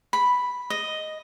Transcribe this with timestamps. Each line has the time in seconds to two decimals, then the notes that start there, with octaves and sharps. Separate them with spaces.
0.13 B5
0.70 D#5